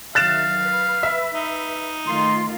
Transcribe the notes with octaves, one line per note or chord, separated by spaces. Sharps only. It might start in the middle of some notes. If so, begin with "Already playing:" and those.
D#3 F#3 E5 F5 F#6 A6 E7
B4
E5
D#4
D#3 A3 F4 C6